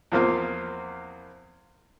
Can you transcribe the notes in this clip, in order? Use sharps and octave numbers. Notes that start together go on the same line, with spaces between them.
E2 F3 A#3 C4 F5